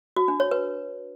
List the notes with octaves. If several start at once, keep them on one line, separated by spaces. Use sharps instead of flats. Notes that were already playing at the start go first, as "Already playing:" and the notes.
F#4
D4
C#5
B4